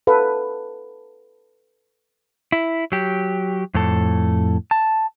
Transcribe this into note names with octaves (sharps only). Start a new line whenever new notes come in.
A4 B4 F5
E4
F#3 G4
F2 A2 A4
A5